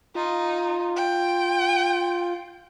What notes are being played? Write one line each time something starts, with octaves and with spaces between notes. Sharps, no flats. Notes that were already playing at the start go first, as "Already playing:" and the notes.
D#4 F4
G5